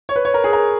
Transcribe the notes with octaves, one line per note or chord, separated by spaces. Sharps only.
C#5
B4
C#5
A#4
G#4
A#4